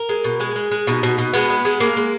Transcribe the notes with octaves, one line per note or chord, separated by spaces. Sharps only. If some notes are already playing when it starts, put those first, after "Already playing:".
Already playing: A#4
G#3
B2
G#3 G#4
G#3
G#3
B2 D#4
B2
B2
G#3 B3
G#3
G#3
G#3 A#3
G#3